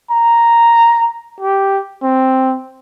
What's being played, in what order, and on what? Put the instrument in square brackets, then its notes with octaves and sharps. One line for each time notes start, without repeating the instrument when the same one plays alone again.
[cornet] A#5
G4
C4